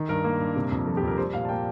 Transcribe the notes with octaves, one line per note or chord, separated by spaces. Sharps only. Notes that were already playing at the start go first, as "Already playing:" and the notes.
Already playing: D#3
G2 A#4
A#3
G2
C3
F2
F3 A4
G4
F2
A#4
G3 C5
A#2 F5
A5
A#3 G5